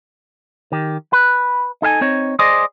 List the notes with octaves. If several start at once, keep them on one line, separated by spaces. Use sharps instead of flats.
D#3 G4
B4
D#4 A4 E5 G#5
C4 D#4 C#5
G#4 C5 D5 D#5